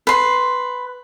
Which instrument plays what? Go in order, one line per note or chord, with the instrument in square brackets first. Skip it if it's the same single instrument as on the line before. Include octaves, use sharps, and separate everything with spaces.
[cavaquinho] B4 C6